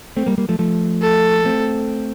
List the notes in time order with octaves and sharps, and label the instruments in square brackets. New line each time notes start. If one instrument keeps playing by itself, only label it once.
[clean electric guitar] A3 C4
G3 A#3
G3 A#3
F3 A3
F3 A3
[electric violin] A4
[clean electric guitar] A3 C4